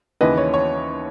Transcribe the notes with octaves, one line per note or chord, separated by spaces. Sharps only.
D#2 C#3 E3 B4 D#5
C#5
C#5